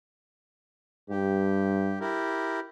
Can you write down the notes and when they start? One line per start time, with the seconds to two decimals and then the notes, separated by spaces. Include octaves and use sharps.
1.10 G2 G4
2.00 E4 G4 A#4